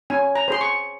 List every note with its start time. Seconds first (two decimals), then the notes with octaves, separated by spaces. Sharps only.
0.10 C#4 G#5
0.35 A#5
0.48 G#4 C5 C6
0.61 C#6